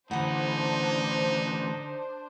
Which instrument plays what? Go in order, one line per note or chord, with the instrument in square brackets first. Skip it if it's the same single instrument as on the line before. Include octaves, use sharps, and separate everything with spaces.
[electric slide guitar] A2 E3 [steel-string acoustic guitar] D3 F#5 [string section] D4 C5 [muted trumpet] D#4